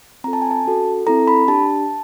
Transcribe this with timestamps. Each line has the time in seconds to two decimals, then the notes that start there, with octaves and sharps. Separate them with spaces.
0.24 C4 F4 A4 A#5
0.33 A5
0.42 G#5
0.51 A5
0.65 C#4 F#4 A4
1.07 C4 E4 A4 A#5
1.27 B5
1.48 D4 G4 A5